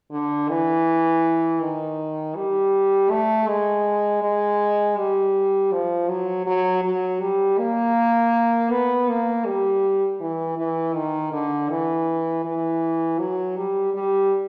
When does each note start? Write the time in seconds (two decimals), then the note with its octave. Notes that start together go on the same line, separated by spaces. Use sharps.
0.11 D3
0.49 E3
1.61 D#3
2.36 G3
3.10 A3
3.47 G#3
4.22 G#3
4.97 G3
5.72 F3
6.09 F#3
6.46 F#3
6.84 F#3
7.21 G3
7.58 A#3
8.71 B3
9.09 A#3
9.46 G3
10.20 E3
10.58 E3
10.95 D#3
11.32 D3
11.70 E3
12.45 E3
13.19 F#3
13.57 G3
13.94 G3